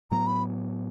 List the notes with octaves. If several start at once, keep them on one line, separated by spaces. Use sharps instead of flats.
A2 F#3 B3 A#5
B5